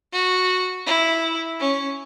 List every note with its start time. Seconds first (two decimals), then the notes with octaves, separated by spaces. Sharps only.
0.13 F#4
0.86 E4
1.59 C#4